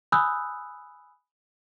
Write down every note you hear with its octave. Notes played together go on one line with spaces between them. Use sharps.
G#5 B5 D#6 E6 F#6 G6